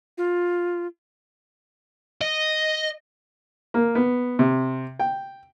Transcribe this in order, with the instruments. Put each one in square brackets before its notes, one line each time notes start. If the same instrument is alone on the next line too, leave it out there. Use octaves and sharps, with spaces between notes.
[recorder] F4
[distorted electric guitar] D#5
[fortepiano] A#3
B3
C3
G5